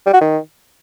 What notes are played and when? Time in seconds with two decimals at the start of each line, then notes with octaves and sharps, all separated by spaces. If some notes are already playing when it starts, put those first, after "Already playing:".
0.06 G3
0.13 F#4
0.21 D#3